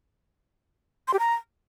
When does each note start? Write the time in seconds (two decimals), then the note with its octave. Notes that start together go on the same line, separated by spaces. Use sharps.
1.08 C6
1.13 G4
1.19 A#5